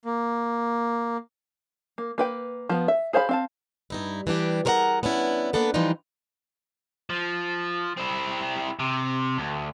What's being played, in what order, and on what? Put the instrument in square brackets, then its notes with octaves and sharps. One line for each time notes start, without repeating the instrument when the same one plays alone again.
[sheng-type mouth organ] A#3
[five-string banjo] A#3
A#3 B4 G5
F3 B3
E5
G#4 C5 F5 A5 B5
C4 F5 A5
[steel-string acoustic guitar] G2 D#4 E4
E3 G3 D4 G4
G#4 A#4 C5 E5 F#5 A#5
B3 C#4 D4 E4
A#3 B3 D4 A4 B4
E3 F3 G3 D4 D#4 F4
[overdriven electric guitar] F3
C4 E4
C3
D2